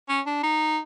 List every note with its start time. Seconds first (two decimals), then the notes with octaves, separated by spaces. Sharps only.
0.09 C#4
0.26 D4
0.43 D#4